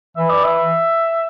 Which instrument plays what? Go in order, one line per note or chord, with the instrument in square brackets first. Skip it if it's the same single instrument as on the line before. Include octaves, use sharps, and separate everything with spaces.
[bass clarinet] E3 [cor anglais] E5
[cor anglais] D5
E5